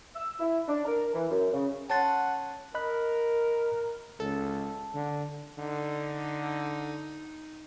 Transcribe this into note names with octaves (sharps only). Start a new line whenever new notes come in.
E6
E4
D4
A#4
E3
F#2
C#3
C#4 F#5 A5 C6 A6
A#4 D#5 B5 F#6
C#2 A4
D3
D3 D#4